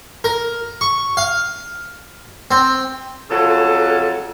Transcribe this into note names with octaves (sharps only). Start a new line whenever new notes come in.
A#4
C#6
F5
C4
F2 C#3 F#3 F4 A4